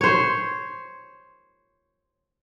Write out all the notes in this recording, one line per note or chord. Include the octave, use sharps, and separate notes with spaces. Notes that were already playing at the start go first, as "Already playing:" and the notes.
C5 C#5